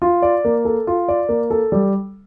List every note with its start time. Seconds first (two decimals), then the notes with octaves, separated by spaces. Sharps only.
0.02 F4
0.22 D5
0.45 A#3
0.65 A4
0.87 F4
1.08 D5
1.29 A#3
1.51 A4
1.72 G3